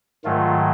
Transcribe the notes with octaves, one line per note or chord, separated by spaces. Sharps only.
G#2 D#3 F#3 A3 F4